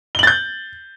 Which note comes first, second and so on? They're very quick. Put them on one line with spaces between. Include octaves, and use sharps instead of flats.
G7 F#7 A6 G6